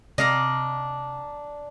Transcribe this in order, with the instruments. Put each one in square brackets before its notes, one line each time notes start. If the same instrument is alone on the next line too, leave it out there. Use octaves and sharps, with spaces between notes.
[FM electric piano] C3 [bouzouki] D4 [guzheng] D#5 F5 A#5